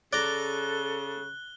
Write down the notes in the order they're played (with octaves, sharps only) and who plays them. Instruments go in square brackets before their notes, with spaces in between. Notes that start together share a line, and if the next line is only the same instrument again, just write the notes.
[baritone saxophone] C#3 [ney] A4 [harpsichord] D5 A#5 [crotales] F#6 G7